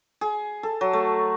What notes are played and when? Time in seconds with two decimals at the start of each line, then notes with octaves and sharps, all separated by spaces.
0.21 G#4
0.63 A4
0.81 F#3
0.93 A3